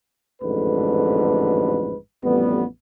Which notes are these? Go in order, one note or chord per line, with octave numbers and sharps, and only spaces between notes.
A1 F2 G#2 D3 B4
A1 F2 G3 B3